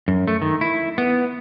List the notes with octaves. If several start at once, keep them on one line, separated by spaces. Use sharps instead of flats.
F#2
A3
D#3
E4
B3